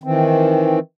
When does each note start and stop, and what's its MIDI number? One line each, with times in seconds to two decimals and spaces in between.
0.03 0.79 51
0.03 0.79 52
0.03 0.79 60